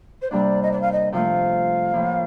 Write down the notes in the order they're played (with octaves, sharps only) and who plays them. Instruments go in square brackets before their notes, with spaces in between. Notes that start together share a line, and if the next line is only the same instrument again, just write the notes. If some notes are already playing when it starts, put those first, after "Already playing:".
[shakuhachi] C5
[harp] C3 G3 A#3 D4 [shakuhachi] D5
[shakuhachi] D#5
D5
F5
D#5
[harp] C3 F3 A3 [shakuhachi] F5
[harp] A2 F3 A#3